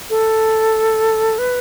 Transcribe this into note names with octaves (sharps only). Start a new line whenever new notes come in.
A4
B4